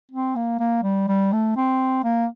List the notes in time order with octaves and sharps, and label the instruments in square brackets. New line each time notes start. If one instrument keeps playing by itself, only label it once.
[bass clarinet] C4
A#3
A#3
G3
G3
A3
C4
A#3